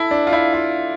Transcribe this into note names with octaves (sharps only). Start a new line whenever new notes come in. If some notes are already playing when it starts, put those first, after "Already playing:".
Already playing: E4 A4
D4
F4
E4
F4